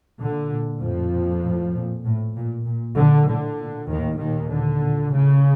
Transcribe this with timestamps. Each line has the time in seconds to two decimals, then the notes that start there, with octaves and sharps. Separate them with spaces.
0.20 A#2 D3
0.51 A#2
0.82 F2 A2 F3
1.12 A#2
1.44 A2
1.74 A#2
2.04 A2
2.36 A#2
2.66 A#2
2.97 A#2 D3
3.27 A2 D3
3.58 A#2
3.89 D#2 A2 D#3
4.20 D#2 A#2 D#3
4.50 A#2 D3
4.81 A#2
5.12 A2 C#3